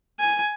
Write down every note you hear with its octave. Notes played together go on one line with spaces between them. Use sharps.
G#5